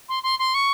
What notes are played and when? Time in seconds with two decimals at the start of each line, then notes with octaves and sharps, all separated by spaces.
0.09 C6
0.23 C6
0.39 C6
0.54 C#6